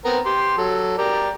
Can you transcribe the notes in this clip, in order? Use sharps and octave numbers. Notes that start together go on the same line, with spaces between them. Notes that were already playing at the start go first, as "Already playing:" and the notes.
B3 C4 A#4
G4 C6
F#3 A4
G4 A#4 D5